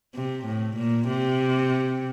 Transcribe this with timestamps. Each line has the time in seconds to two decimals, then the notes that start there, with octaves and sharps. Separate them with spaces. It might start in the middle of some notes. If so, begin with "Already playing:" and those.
0.15 C3
0.46 A2
0.77 A#2
1.09 C3